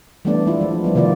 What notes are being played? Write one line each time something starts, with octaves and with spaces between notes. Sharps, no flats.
E3 G3 A3 B3 D4 D5
G#3 E4 F4
F3
F3 G3 B3
C3 D#3 A#3 F4 D5